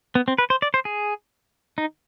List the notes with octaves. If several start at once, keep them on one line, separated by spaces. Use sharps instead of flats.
B3
C4
B4
C5
D5
C5
G#4
D#4